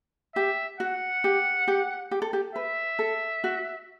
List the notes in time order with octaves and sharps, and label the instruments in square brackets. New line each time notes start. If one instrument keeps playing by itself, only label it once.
[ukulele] G4 [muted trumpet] E5
[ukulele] F#4 [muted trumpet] F#5
[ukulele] G4
G4
G4
A4
G4
[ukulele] B4 [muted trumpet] E5
[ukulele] A4
F#4